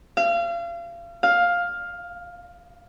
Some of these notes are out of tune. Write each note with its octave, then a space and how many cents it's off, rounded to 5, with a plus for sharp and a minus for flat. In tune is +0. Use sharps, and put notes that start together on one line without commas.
F5 -35
F5 +10